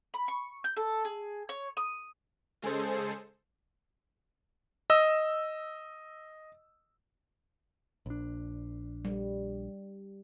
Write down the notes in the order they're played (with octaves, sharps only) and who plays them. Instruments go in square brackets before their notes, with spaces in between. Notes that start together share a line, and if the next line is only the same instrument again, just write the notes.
[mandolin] B5
C#6
G6
A4
G#4
C#5
D#6
[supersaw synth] C#3 G#3 G#4 A4 C5
[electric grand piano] D#5 E6
[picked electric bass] A#1 D4
[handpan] G3